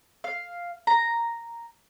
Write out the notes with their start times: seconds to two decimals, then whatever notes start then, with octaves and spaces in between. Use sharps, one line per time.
0.24 F5
0.87 A#5